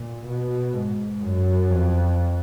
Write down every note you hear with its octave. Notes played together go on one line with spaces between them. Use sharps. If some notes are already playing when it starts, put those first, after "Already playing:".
Already playing: A#2
B2
G#2
F#2
F2